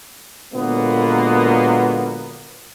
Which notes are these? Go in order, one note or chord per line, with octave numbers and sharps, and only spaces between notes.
A#2 D3 F#3 G#3 A#3 B3